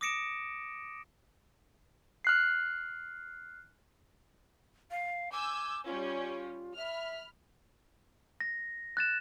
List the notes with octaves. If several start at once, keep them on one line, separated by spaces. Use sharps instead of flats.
D6 D#6 A#6 C#7 D7 E7
F6 F#6 C7
F5
G#5 D6 E6 G6
G3 C#4 F4
E5 B5 F6
A#6
F#6 A6 E7